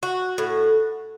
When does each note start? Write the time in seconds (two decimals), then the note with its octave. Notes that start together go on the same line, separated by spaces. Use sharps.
0.03 F#4
0.38 A2